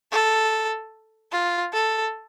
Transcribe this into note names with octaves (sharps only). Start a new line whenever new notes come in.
A4
F4
A4